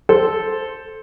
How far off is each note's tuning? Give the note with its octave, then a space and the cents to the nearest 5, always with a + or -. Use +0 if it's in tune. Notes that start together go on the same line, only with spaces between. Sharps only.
A4 -10 C5 +0